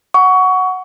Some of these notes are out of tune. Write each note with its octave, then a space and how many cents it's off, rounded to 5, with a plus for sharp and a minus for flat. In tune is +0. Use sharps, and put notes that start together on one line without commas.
F#5 +0 C#6 +20